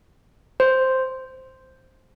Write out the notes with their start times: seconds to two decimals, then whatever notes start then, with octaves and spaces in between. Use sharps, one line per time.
0.60 C5